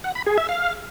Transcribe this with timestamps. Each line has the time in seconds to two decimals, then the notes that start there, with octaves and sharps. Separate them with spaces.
0.04 F#5
0.15 B5
0.26 G#4
0.38 E5
0.49 F5